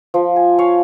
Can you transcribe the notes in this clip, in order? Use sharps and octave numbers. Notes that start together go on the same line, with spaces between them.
F3
G#5
C#5 F5 G#5